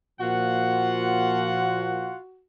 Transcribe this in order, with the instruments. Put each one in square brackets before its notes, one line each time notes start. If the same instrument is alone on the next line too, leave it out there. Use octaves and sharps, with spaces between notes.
[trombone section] A#2 F3 [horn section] F4 F#5 [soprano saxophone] F#4